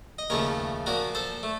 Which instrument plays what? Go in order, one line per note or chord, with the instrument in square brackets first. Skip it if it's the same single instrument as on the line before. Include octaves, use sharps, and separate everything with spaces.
[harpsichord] D#5
D#2 C#3 F3 A3 A#4 C#5
A#2 F3 A#3 F#4 A#4
A4 C5
A3